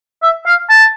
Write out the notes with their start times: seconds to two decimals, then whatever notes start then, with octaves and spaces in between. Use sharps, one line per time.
0.23 E5
0.46 F5
0.70 A5